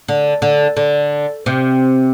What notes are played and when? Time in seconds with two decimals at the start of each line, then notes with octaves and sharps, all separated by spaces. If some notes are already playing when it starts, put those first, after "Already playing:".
0.08 D3
0.42 D3
0.77 D3
1.46 C3